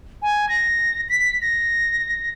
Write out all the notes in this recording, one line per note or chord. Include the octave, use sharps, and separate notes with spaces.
G#5
A#6
B6
A#6